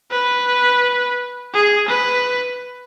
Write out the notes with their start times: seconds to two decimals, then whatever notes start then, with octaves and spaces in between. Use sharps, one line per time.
0.11 B4
1.54 G#4
1.89 B4